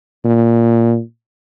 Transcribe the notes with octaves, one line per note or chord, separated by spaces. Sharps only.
A#2